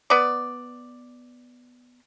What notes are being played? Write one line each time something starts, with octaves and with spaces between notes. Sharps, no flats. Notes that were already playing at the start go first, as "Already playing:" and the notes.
B3 D5